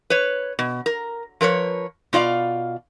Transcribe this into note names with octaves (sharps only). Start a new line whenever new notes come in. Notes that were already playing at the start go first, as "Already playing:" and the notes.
B4 C#5
B2
A#4
F3 A#4 B4 C#5
B2 F4 D5 F5